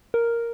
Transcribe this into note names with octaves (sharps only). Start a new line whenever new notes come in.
A#4